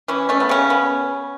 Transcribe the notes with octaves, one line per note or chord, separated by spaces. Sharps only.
E3 C#4
A3 C#4
B3
C#3 C#4
B3